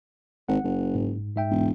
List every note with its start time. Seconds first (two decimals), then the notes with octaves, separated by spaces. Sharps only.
0.49 G#1 F#5
0.64 F#1
0.95 G#2
1.36 G#2 E5 G5
1.51 E1